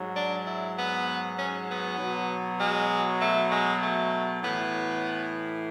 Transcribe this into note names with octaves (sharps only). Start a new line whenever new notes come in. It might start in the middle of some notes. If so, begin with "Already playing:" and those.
Already playing: G#2 F#3
D4
E4
B3
C#4
B3
B2 F#3
G#3
A3
G#3
A3
A2 E3 B3